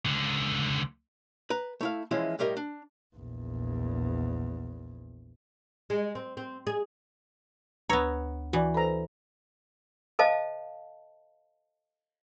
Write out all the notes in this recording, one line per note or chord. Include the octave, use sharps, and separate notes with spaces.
C#2 D3
B4 A#5
A3 E4 F5
E3 F3 G#3 C#4 E4
A2 G3 G4 A#4 D#5
D4
A#1 E2
G#3
C4
C4
G#4
D2 B3 B4 C#5 A#5 E6
E3 F#4 D5
A4 B4 C5 A#5 B5
A4 C5 D#5 F5 A5